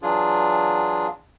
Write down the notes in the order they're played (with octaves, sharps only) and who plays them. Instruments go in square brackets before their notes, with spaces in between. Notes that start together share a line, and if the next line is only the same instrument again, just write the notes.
[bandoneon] E3 F#3 D4 F4 G#4